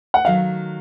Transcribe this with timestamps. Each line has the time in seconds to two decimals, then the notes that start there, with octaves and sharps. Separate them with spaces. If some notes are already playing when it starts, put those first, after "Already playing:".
0.14 F#5
0.25 D#3 F#3 A3 F5